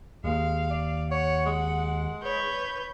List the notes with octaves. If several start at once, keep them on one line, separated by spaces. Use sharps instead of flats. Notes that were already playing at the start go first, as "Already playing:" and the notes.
D#2 G#3 F5
D5
C#5 F#5
G#3
B4 C#5 G6